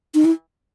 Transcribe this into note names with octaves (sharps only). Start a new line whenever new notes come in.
D#4
E4